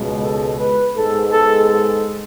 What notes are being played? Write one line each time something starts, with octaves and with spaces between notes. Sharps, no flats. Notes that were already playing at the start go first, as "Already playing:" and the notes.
Already playing: C#2 B2 G#3
A4
B4
G#2 G#3 B3 A4
A4
A4